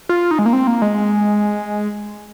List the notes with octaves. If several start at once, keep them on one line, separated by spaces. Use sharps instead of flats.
F4
D#4
G#3
A#3
C4
A#3
G#3